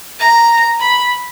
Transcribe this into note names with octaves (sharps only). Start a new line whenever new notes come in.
A#5
B5